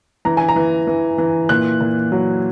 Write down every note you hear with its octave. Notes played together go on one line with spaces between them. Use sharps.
E3 A#5
G#5
A#5
E3
E3
E3
A#2 F#6
A#2
F#3